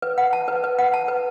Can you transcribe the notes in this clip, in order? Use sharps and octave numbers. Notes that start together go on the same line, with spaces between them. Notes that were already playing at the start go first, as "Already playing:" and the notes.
B4
F#5
A5
B4
B4
F#5
A5
B4